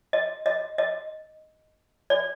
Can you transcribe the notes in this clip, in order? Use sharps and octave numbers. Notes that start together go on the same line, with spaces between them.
D#5
D#5
D#5
D5